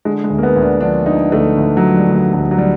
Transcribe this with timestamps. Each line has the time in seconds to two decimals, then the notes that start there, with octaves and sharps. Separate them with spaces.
0.05 D3 G#3
0.24 G#3
0.30 D2
0.38 A#3
0.43 B3
0.56 D2
0.62 D4
0.81 F3 D4
1.06 D3 D#4
1.32 D2 A3
1.58 D2
1.77 F#3
1.82 F3
1.96 G3
2.08 D3
2.15 G3
2.33 D2 F#3
2.51 F#3
2.58 G3